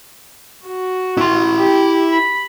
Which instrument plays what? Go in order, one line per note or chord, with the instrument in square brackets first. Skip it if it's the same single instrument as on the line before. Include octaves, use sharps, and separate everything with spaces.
[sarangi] F#4
[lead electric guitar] E4 C6
[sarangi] G4
B5